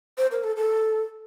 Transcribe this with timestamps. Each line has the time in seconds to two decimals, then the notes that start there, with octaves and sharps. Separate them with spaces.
0.18 C5
0.31 A#4
0.44 A4
0.56 A4